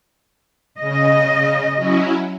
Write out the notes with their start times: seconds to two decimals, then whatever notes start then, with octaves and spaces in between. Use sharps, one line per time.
0.80 C#3 D#5
1.75 F#3 C#4 E4